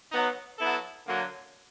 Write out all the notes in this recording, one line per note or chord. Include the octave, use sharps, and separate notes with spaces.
F#3 B3 D#4
F#3 B3 E4 A4
D3 F#3 A#3